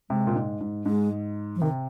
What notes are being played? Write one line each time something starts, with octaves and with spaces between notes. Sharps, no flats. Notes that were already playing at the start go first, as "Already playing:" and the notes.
C3 G#3
A#2
G#2
G#2
G#2 G#3
F3
C3 D#3